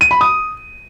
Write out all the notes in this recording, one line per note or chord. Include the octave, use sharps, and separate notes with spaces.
D#7
B5
D#6